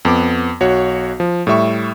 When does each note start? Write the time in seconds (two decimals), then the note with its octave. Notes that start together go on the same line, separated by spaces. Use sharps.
0.05 F2 B3 D6
0.60 B1 F#4 C#5
1.20 F3
1.47 A2 G3 E5 C#6